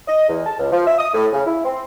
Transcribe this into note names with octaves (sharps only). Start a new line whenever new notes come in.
D#5
E2
A5
C#2
F3
E5
D#6
A2
C#3
E4
C4